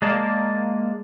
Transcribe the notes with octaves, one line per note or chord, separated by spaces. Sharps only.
G#3 A#3 D5 A5